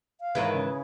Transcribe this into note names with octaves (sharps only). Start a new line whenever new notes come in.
F5
G#2 D#3 E3 E4 G#4 B4
C#3